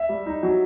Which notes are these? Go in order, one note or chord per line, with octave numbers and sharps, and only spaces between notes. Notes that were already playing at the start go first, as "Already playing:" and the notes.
Already playing: E5
G3
D#4
F#3